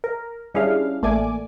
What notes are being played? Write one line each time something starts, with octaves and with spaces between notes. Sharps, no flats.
A#4
G3 C#4 D4 E4 G#4 F5
A1 A3 A#3 D5 G#5 D6